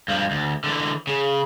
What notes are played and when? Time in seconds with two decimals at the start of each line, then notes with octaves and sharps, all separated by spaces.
0.08 G2 F3
0.31 D2
0.64 D3 E3
1.07 C#3